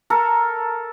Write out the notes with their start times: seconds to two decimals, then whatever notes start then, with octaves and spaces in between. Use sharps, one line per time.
0.10 A4 A#4